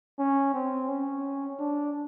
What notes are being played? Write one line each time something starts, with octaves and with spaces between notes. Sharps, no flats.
C#4
C4
C#4
D4